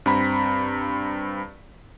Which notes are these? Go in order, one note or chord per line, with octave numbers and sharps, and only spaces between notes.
G2 C4 A#5 B5 B6